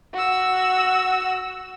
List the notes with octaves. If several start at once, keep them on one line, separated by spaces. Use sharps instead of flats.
F#4 E6